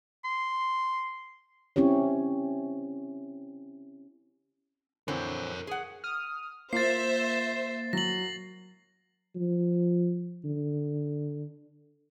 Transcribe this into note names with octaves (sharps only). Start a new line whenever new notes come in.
C6
C4 C#4 E4 G4 C#5
D3 E3 C4 A#4 C#5
G#4 F#5
D#6 F6
A#3 F4 C5 E5 A6 C7
F#3 A#6 F#7
F3
D3